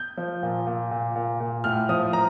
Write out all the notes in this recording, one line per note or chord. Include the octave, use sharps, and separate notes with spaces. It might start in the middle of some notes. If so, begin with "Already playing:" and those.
Already playing: G6
F3
A#2
A#2
A#2
A#2
A#2
A2 F6
F3 D#6
F3 A#5